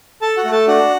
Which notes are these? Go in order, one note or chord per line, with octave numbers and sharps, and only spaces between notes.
A4 A5
F#4 F#5
A3
A4 A5
D4 F#4 F#5